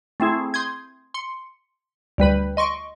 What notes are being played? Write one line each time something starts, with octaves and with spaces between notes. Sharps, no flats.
A3 C4 E4 G#4
C6 D#6 G6 G#6
C6 C#7
D2 G3 B4 B5
D#5 C6 C#6 D7